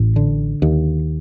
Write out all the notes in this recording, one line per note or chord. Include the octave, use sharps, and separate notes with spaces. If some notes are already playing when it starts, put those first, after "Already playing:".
Already playing: A1 A2
D3
D#2